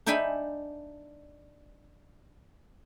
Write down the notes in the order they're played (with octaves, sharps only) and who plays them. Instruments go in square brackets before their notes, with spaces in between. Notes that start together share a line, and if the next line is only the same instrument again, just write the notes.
[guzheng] D4 D#4 E5 G5 G#5 B5